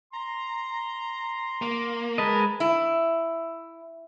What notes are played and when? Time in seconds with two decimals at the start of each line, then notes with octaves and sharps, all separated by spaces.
0.13 A#5 C6
1.62 A#3
2.18 G#3 A#4 B4 D#5 A5
2.60 E4